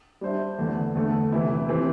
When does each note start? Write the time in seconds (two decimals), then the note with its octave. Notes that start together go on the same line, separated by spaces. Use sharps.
0.21 G3 D4 C5 E5
0.59 E2 D3 A3
0.95 E2 D3 A3 D4
1.32 C3 E3 C4 E4
1.69 E3 C4 G4